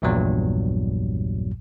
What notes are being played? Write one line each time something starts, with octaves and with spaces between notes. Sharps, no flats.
A#1 E2 G2 A#2 F#3 G3